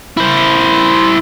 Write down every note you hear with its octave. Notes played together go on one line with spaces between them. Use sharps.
E4 C5